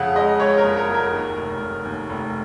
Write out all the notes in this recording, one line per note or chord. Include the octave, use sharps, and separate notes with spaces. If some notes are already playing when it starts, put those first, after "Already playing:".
Already playing: F2 C#3 F5 F#5
G#3 D#5
G#3 C#5
A#4
F#1
A#4
F#1
A#4
D#2
F1
F1
D#2
F1